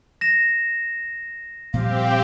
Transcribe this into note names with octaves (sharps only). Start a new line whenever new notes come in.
A#6 E7
A#2 F3 G3 C4 G4 F5